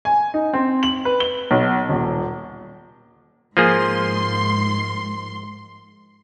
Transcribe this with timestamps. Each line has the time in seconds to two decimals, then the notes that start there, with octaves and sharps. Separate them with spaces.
0.05 G#5
0.34 D#4
0.54 C4
0.83 F#7
1.05 B4
1.20 G7
1.51 B1
1.89 D#1
3.57 G#2 F3 A#3 G#4 C6